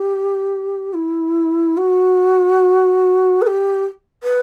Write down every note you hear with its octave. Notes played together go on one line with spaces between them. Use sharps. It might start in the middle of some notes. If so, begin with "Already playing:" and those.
Already playing: G4
E4
F#4
B4
G4
B4